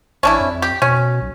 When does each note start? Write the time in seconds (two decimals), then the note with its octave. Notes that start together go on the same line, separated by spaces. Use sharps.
0.23 A1 C#4 D4 E4
0.40 F2
0.62 G4
0.82 B2 C#4
1.22 B1